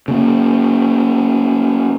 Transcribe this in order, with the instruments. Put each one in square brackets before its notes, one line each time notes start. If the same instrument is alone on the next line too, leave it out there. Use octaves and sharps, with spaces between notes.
[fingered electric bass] C#3 A#3